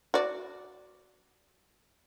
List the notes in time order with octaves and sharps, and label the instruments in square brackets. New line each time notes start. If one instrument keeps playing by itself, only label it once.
[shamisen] F#4 D5